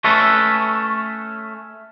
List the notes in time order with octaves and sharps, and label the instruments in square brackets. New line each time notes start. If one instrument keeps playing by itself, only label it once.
[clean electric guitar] A3 C#4 A4 B4